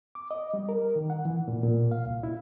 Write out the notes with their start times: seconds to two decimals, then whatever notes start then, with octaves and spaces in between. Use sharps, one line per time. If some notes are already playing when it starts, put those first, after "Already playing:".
0.15 D6
0.31 D#5
0.54 G3
0.69 A#4
0.96 D#3
1.10 F#5
1.25 E3
1.48 A#2
1.63 A#2
1.91 F5
2.06 C2
2.23 E4